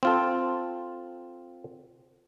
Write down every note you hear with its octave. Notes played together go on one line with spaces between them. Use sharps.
C4 F4 A4